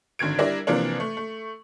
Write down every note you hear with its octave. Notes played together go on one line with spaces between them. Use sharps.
G#1 D3 D#3 G#6 D7
G3 D4 E4 A#4 D5
C3 E3 F3 A#3 D4
A3
A3